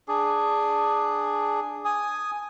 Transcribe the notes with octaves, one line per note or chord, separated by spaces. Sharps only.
D4 G#4
G#5 D#6